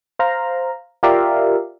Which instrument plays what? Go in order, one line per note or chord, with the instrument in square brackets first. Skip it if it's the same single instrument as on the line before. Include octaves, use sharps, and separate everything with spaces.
[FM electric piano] C5 F5 A#5
F4 G4 A#4 D5 E5 F5